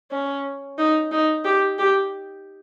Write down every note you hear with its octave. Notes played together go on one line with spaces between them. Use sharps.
C#4
D#4
D#4
G4
G4